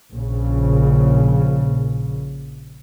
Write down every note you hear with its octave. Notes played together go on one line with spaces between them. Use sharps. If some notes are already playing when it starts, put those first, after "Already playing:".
A#1 A#2 C#3